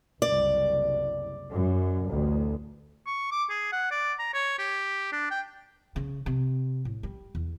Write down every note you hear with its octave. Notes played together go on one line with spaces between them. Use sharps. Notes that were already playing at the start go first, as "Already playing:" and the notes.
F#1 C2 D5
F#2
A1 D2
C#6
D6
G#4
F#5
D5
A#5
C#5
G4
D4
G5
C#3
C3
A2
G3
E2